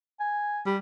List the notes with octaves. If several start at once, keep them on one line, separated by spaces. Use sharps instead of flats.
G#5
G3